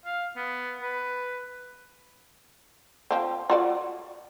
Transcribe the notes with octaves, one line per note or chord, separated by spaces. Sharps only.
F5
B3
B4
F3 C4
F4 F#4 D5